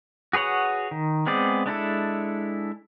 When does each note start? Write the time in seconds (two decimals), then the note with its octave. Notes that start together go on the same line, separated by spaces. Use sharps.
0.33 F#4 G#4 B4 C#5 F#5
0.91 D#3
1.26 G#3 B3 C4 G#4 D5
1.66 G#3 D4 E4 A4